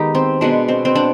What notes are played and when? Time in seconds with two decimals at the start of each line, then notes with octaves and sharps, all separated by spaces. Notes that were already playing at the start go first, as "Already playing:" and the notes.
Already playing: D#3 G#3 B3 D#4 G4
0.15 C4
0.41 B2 G#3 B3 D4
0.68 C4
0.85 C4
0.95 D4